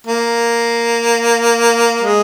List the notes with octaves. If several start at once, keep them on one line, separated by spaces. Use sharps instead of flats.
A#3
G#3